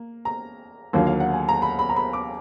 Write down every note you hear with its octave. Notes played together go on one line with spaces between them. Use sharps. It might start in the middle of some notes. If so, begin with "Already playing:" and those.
Already playing: A#3
A#5
D#2 D3 F#3 A#3 F4
F5
F#5
G#5
A#5
B5
B5
A#5
B5
D6